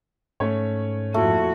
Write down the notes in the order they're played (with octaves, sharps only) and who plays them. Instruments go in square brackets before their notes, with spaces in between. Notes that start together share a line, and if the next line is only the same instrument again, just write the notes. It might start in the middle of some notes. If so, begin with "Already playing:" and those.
[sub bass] G#2 [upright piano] A3 C#4 C#5
[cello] F2 F#4 [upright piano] A#2 E4 [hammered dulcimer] A3